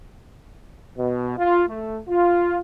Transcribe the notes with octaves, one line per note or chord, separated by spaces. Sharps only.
B2
F4
A3
F4